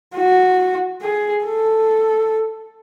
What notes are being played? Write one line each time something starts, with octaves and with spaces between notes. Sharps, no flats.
F#4
G#4
A4